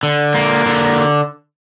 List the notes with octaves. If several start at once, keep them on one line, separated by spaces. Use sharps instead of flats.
D3
A#3
D3